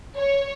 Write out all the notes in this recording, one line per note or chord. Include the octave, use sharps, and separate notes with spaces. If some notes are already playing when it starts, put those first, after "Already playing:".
C#5